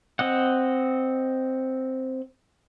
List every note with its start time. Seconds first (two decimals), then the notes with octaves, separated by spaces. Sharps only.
0.19 C4 D#5 F#5